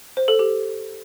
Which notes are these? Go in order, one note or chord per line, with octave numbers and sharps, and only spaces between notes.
C5
A4
G4